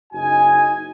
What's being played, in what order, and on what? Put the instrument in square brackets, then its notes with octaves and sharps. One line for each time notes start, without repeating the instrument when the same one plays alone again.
[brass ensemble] F#1 D#4 F#4 D#5 G#5